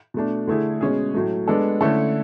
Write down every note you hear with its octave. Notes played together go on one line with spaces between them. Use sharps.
B2 A3 D4
D3 A3 E4 G#4
B2 G#3 C#4 G#4
A2 F#3 A3
G#3 B3 D4 A4
D3 A3 C#4 E4 A4